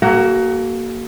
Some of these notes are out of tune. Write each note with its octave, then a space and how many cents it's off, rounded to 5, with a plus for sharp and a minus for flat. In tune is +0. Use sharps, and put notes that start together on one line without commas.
A#3 +0 F#4 +25 A4 -40